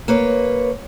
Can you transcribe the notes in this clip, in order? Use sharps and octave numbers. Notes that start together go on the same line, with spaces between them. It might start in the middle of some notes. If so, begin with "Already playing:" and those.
A#3 B4 C#5